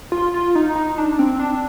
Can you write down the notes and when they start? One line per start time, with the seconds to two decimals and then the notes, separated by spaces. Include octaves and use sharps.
0.12 F4
0.34 F4
0.55 D#4
0.75 D#4
0.98 D4
1.19 C4
1.39 D4